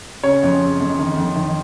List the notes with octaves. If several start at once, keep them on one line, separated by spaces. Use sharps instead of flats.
C#3 C#5
F2
C#3
F2
D#3
F2
D#3